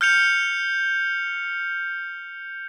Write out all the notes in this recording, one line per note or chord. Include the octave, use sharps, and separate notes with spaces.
F6 G6 C#7 F7